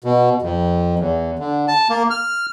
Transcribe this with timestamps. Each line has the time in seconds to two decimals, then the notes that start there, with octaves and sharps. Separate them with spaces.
0.04 B2
0.42 F2
0.99 E2
1.39 D3
1.68 A5
1.90 A#3
2.10 F6